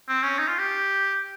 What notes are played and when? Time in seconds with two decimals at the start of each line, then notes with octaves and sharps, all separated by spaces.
0.08 C4
0.23 C#4
0.39 D#4
0.48 F4
0.58 G4